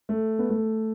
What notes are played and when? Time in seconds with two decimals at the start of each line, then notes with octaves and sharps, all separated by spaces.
0.09 A3
0.39 B3
0.50 A3